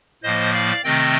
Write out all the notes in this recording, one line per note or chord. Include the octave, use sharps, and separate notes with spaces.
A2 F3 A#3 C5 D#5
D5 F5
C3 D#3 A3 C4 D#5 G5